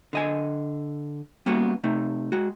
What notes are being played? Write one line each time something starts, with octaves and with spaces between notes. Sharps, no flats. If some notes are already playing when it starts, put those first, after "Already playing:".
D3 D#5 G#5
G3 A#3 B3 C#4 F#4
C3 A3 D#4
G#3 F#4